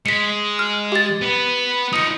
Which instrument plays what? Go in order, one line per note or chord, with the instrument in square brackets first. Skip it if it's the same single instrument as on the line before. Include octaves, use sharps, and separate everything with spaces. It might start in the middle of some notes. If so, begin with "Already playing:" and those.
[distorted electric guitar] G#3 [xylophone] B6 C#7
[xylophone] F6
G4 A6
[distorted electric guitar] B3 B4
[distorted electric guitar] D#4 F4 [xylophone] D#6 C#7